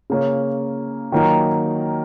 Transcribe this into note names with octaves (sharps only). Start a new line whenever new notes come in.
C#3 A#3 C#4
D#3 F#3 A#3 D#4 A#4